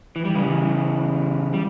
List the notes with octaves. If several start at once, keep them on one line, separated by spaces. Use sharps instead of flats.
E3
G3
C#3 E3
G3